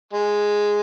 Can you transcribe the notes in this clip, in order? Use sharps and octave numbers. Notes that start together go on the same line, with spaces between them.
G#3